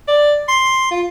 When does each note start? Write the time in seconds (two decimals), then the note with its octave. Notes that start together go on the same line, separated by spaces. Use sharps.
0.08 D5
0.48 C6
0.91 F4